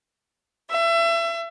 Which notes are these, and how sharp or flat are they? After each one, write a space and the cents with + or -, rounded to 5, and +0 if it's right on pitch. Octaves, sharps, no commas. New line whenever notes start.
E5 +30